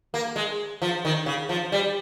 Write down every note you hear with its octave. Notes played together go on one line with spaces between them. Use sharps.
A#3
G#3
F3
D#3
C#3
F3
G3